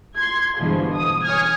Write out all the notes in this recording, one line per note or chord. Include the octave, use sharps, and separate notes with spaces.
C6 G#6
G2 B2 D3 E3 F3 G#3
D#6
C#5 G#5 D#6 F6 G#6